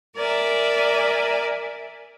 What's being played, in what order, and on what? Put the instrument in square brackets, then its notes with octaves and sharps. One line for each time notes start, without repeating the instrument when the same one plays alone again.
[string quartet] A#4 D5 E5 G#5